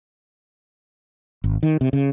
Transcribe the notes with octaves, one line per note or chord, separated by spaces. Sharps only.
G#1
D#3
C3
C#3